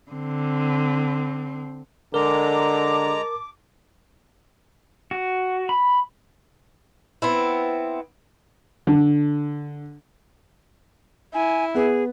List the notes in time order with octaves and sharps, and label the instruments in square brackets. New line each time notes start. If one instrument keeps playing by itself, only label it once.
[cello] D3 C4
[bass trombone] D3 [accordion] G#3 A#5 [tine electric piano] A#4 [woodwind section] A5 D6
[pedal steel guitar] F#4
B5
[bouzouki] B3 C4 E4
[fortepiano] D3
[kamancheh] E4 [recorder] G#5
[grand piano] B3 [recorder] G#4